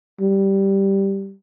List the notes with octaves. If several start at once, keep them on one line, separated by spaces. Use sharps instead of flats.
G3